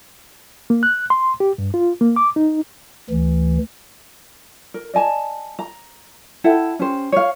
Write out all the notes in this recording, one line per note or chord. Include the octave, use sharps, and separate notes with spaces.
A#3
F#6
C6
G4
G2
F4
A#3
D6
D#4
D2 E3
A#4
D5 D#5 G#5 A5
A#5
E4 A4 F#5 G5
C#4 G4 C5
C#5 F5